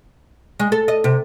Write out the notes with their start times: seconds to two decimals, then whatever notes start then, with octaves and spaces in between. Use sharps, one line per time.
0.60 G#3
0.72 A4
0.88 D#5
1.04 C3